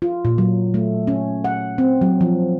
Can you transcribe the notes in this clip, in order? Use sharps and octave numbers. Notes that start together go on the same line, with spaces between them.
F4
A#2
F#3
A3
C#4
F#5
C4
F#3
F3